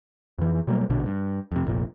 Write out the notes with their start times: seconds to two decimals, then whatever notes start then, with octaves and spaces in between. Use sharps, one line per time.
0.38 F2 E3
0.67 B2 F#3 G3 A#3
0.90 A#1 B2 D3
1.06 G2
1.52 F2 C3
1.65 F1 A#1 A#2